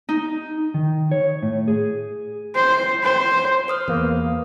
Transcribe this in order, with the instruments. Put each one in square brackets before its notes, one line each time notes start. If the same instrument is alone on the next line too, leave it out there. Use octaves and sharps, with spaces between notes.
[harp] D#4
[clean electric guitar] D#3
C#5
A2
G#4
[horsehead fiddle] C5
C5
[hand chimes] C5 D#6 F6
[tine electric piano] E2 A#3 [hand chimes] B4